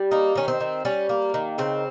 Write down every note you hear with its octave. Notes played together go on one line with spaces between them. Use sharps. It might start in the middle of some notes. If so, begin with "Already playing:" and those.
Already playing: G3
A#3 D#4
D#3 C#4
C4
D#3
G3 C#4
A#3
D#3
C#3 C4